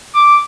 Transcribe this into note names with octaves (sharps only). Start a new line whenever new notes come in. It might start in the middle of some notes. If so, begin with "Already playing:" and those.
D6